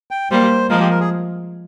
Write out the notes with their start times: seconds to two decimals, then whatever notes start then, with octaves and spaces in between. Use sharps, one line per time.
0.11 G5
0.31 G3 A#3 C5
0.70 F3 G#3 A#4
0.80 G4
0.90 A#4
1.00 G#4